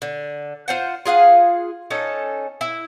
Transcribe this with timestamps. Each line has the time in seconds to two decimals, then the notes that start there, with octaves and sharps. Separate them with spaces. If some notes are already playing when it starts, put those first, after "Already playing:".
0.02 D3
0.68 F4 C5 F#5
1.05 F4 G#4 F5 F#5
1.90 C#4 D#4 A4
2.61 E4